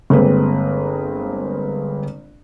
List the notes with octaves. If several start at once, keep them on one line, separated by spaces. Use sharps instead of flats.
G1 G#3 A#3 C4 B4